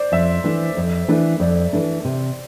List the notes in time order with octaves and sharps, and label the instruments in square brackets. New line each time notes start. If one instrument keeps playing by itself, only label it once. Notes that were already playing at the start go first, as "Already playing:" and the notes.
Already playing: [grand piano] C5 D5
[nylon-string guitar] F2 [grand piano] E5
[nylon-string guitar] E3 A3 D4
F2
E3 A3 D4
[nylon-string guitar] F2 [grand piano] D5
[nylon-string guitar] E3 A3 D4
C3